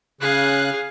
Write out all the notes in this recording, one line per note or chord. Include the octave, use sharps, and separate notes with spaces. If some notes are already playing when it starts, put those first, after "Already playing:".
C#3 G#4 F5 F#6